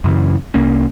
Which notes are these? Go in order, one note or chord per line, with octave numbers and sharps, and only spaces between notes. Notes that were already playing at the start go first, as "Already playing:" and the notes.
F#2 C#3 E3
C2 A#3 C#4